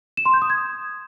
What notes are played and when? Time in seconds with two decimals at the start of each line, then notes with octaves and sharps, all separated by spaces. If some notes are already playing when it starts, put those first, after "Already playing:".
0.17 E7
0.26 C6
0.34 G6
0.42 D#6
0.50 G#6